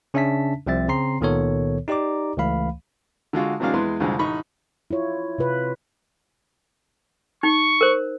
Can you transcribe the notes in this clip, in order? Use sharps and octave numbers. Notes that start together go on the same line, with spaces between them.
C#3 C#4 D4 E5 A5 B6
C2 F3 C4 E5 A6
C#3 C4 A#5 C6 C7
C#2 A#2 D#3 B3 A4 C#5
D#4 G4 D5 A#5 D6
C#2 E3 A3 F5 B5
D3 G#3 F4 F#4
C3 E3 F#3 G#3 D4 F5
E2 E3 G#3 B4 C6
C2 F2 D3 F3 G#3
A1 D#4 B5 C#6
E4 F4 C#5
C3 F4 B4
D#4 C#6
A#4 C5